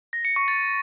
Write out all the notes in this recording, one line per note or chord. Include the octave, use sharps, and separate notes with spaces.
A#6
C#7
C#6
A6